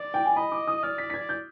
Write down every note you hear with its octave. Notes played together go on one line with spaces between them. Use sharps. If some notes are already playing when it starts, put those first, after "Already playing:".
Already playing: D5
G5
G#5
D#5 B5
D6
D#6
D5 F6
B6
B6
G#6
G6